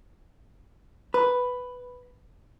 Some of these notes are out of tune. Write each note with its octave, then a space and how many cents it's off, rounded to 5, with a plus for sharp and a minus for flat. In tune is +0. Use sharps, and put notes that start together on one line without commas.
B4 +5